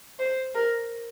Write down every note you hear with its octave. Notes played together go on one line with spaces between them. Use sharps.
C5
A#4